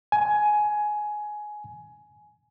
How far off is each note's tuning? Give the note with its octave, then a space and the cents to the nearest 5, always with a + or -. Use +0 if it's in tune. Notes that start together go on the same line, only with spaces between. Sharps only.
G#5 +15